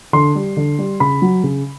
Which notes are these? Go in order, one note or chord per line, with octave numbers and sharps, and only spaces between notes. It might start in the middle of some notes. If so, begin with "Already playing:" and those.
D3 C6
G3
D3
G3
C#3 B5
F#3
C#3